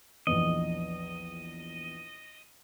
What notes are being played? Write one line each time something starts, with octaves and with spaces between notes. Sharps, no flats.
A#1 E2 D#5